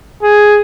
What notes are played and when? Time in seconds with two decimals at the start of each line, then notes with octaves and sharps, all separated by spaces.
0.23 G#4